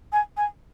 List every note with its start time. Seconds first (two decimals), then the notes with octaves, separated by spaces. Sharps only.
0.13 G#5
0.37 G#5